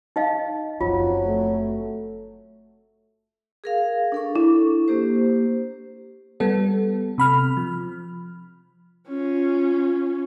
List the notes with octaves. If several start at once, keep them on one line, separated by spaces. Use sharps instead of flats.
D#4 D#5 F5
F#1 F3 F#3 C4 F4
A3
G#4 A#4 F5
D4 A4 C#6
E4
A#3 G4 C5
G3 B3 A4
C3 B5 F6
F3
C#4 F4